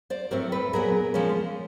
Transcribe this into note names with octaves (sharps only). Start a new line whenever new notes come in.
C5 D5
A2 F#3 A3 C4 A#4 C5
A4 B4
A#2 F#3 B3 G#4 A#4
F3 G#3 C#4